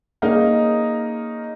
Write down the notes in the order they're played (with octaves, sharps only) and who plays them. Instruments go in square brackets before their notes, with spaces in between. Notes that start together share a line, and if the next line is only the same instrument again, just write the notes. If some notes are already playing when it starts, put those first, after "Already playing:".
[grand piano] A#3 C#4 D#4 G#4 A#4 F5